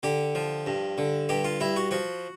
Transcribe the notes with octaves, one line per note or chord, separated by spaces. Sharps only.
D3 G4
F3
G2
D3
G2 G4
F4
G2 E4
F#4
F3 F#4